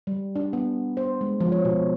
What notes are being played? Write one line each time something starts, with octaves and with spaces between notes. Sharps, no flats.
G3
D4
B3
C5
G#3
F3
C#5
B2